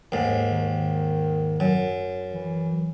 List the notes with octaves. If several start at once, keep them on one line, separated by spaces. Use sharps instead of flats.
D#2 G#2
D#3
F#2
E3